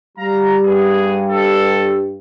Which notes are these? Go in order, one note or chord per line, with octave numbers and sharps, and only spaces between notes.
G3 F5 A#5
G2 B3 G#4
A4